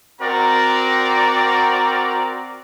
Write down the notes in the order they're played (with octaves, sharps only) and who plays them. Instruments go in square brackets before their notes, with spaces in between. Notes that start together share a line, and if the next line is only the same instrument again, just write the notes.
[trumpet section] C4 F#4 A#4 D5 A#5